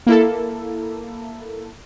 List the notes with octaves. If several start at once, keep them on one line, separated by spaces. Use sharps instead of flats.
A#3 E4 A4